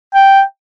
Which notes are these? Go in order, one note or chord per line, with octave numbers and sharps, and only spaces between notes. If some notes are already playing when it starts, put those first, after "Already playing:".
G5